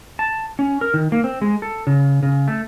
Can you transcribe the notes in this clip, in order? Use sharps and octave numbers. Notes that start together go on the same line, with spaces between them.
A5
C#4
A#4
D#3
A#3
C4
G#3
A4
C#3
C#3
A3